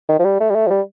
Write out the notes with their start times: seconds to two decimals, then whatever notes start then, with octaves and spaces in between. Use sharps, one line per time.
0.09 D#3
0.19 F3
0.24 G3
0.40 A3
0.50 G3
0.55 A3
0.67 F3
0.70 G3